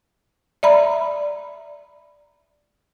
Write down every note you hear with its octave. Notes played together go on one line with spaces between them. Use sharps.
D5 E5 A#5 B5